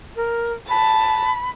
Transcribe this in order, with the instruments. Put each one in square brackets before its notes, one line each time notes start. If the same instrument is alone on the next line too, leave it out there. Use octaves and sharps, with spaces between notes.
[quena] A#4
[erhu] A5 [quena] B5